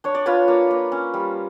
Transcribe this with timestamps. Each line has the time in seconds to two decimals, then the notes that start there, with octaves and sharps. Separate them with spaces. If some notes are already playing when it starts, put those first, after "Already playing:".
0.04 D4 C#5
0.15 D5
0.26 F4 B4 C#5
0.48 A#3
0.71 A#3
0.92 C#4
1.14 G3